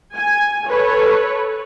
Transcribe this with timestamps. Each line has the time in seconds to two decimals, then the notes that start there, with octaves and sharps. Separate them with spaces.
0.15 G#5
0.68 A4 B4 C#5